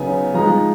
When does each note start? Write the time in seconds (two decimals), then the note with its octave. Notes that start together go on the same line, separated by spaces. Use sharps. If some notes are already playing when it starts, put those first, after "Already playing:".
Already playing: C#3 F#3 B3 D#4 G#5
0.34 F3 G#3 D#4 A#5